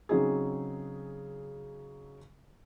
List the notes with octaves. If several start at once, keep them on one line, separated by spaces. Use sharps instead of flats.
C#3 F#3 C4 D#4 G#4